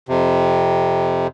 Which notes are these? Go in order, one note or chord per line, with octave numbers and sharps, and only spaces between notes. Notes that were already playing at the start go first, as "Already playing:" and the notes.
F2 C3